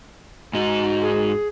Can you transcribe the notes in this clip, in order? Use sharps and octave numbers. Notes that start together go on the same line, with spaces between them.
G#2 D#4 F#4
G#4